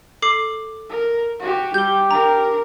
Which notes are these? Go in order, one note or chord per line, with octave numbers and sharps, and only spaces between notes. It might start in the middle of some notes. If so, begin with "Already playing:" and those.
A4 D6 C7
A#4
F#4 G4
G3 G4 G6 G7
D4 A#4 A#5